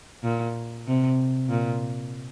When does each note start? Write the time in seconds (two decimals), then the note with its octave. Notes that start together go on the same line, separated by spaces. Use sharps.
0.23 A#2
0.87 C3
1.49 A#2